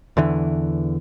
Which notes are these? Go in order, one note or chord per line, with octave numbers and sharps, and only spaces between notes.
E2 D3 E3